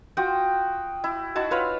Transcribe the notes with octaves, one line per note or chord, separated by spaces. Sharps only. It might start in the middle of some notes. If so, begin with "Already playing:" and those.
F4 F#4 G5 D#6
E4
D#4 E4 F#4 A5
F4 B4 C#5 F5